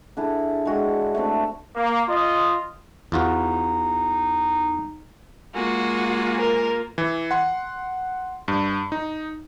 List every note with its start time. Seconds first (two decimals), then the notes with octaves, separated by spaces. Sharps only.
0.17 D3 D4 E4 G#4
0.65 G#3 D4 F#4 G5
1.15 A3 C4 D4 B4
1.74 A#3
2.09 F4 D#5
3.12 E2 D#4 F4 F#4
5.55 G#3 A#3 F4 F#4
6.38 A#4
6.98 E3
7.31 F#5 C6
8.48 G2
8.92 D#4